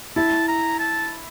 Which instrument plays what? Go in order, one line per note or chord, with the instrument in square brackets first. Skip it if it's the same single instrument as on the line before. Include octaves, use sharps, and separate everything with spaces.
[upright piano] E4 [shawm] A5
[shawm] A#5
A5